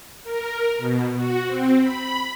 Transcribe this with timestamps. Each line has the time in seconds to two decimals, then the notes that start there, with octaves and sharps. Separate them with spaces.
0.24 A#4
0.78 B2
1.14 F#4
1.47 C4
1.79 B5